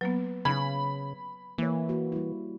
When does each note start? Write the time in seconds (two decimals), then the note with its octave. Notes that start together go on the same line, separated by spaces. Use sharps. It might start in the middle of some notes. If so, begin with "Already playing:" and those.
0.01 F#3 A#3 B3 B4
0.45 C#3 B5 G#6
1.58 E3 A#3 C#5
1.89 A#3 F#4
2.12 G3 E4